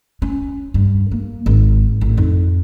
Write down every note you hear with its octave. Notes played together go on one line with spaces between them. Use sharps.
C#4
G2
A#3
G#1
A1
F2 D#4